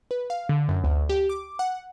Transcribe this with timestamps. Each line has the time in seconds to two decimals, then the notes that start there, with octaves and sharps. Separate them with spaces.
0.11 B4
0.30 F5
0.49 D3
0.69 F#2
0.84 D2
1.09 G4
1.29 D6
1.59 F#5